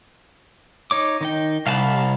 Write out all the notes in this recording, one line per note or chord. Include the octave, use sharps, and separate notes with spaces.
D#4 C#5 D6
D#3 D#4 G5
C2 F5 A5 B5